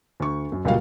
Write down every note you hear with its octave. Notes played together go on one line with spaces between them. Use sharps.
D2 C#6
F#2
C#2 A#2 G3 F#4 F5